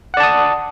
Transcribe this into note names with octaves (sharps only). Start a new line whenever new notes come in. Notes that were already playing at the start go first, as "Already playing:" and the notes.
D5 F#5 A5 D#6